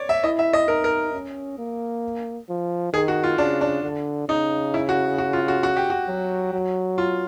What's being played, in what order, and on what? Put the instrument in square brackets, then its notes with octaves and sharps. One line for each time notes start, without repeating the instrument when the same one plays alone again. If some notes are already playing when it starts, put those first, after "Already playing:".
Already playing: [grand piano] C#5 D5
E5
[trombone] E4 [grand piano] D#5
[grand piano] E5
D#5
[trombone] D#4 [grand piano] A#4
[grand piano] A#4
[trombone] C#4
A#3
F3
[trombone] D#3 [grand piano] G#4
[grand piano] F#4
F4
[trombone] C#3 [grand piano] D4
[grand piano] D4
[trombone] D3
[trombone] C#3 [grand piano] D#4
[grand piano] E4
F#4
F#4
F4
F#4
F#4
G4
F#4
[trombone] F#3
F#3
[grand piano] F4